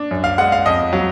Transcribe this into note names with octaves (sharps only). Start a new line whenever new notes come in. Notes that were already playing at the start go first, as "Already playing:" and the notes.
Already playing: D4
F#2
F5
G#3 F#5
F5
F2 D#5
F#3